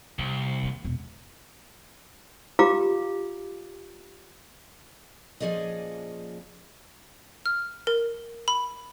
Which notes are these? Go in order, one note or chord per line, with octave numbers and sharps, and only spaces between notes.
C2 D3
D#3 A#3
E1 E2
F4 G4 F5 A#5 D6
A#2 F3 C#4 G#4 D5 D#5
F6
A#4
B5